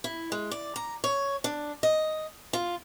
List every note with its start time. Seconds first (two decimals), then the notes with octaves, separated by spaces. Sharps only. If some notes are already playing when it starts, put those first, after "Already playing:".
0.04 E4
0.32 G#3
0.51 D5
0.76 A#5
1.04 C#5
1.44 D4
1.83 D#5
2.53 F4